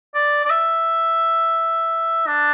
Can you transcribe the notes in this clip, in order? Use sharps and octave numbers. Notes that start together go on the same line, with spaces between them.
D5
D5
E5
D4